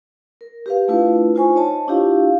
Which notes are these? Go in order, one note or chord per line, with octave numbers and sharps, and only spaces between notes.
A#4
G4 B4 F5
A3 D4 E4 F4 B4
D#4 F4 C5 G#5 C#6
C#5 D#5 A5
C#4 D4 E4 F4 G4 F5